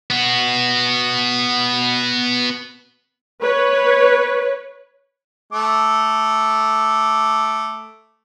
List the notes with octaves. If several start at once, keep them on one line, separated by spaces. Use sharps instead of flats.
B3 F#4
B4 C#5
A3 D6